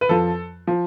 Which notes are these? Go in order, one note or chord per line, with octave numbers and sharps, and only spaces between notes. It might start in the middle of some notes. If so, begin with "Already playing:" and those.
B4
F2 F3 A4
F3